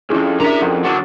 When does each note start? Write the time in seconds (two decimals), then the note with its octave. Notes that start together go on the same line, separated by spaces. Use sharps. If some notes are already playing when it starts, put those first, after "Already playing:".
0.10 B1 F2 C#4 E4 G#4
0.40 D4 A#4 E5 A#5
0.61 F2 F#5
0.84 D3 F#3 A6